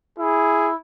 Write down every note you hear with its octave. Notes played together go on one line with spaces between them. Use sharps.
E4 G#4